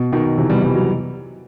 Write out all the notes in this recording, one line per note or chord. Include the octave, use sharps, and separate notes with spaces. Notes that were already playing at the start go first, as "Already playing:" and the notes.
Already playing: B2
B2 D#3
C3 E3
G3 B3
E3 G3
F#3